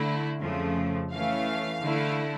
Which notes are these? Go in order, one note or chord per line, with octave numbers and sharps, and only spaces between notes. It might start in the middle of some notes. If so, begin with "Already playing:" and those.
Already playing: D3 A3 E4
F2 C#3 F3 A3
E3 A3 C#4 F5
D3 A3 E4